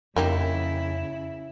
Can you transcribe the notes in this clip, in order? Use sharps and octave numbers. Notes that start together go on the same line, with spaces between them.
F2 C#3 A#3 D#4 E4 G4